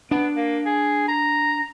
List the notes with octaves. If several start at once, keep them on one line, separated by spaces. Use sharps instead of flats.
B3 D4
A#3
G#4
A#5